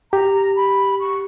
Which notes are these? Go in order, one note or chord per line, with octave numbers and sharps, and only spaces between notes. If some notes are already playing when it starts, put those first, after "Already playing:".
G4 A#5
B5
C#6